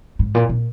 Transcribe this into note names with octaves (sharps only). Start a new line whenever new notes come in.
G#2
A#2
A#2